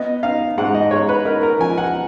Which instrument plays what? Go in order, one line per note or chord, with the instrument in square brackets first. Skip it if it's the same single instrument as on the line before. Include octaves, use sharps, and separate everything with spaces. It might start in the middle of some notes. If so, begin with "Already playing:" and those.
Already playing: [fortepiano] B3 D#5
D#4 F5
G#2 F#5
D#5
G#2 C#5
B4
D#4 A#4
A#4
F3 G#5
F#5